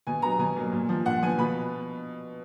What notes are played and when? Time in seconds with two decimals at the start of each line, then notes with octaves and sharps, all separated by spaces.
0.07 B2 G#5
0.22 F#3 B3 A#5
0.39 B2 G#5
0.57 F#3 A#3
0.72 A#2
0.88 F3 B3
1.05 A#2 F#5
1.22 F3 B3 G#5
1.38 B2 B5